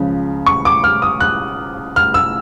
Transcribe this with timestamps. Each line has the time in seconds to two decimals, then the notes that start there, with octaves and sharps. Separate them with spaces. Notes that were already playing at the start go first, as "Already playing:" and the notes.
Already playing: C#2 C#3 F3
0.46 C#6
0.65 D6
0.84 F6
1.02 D#6
1.20 F#6
1.96 F6
2.14 E6